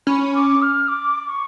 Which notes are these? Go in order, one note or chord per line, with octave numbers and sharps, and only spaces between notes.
C#4 B5
D6
F6
D6
C#6